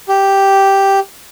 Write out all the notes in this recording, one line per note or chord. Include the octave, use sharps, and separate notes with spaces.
G4